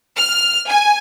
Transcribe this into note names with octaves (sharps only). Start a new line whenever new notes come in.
F6
G#5